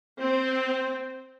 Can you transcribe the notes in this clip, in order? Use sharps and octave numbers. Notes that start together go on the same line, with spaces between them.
C4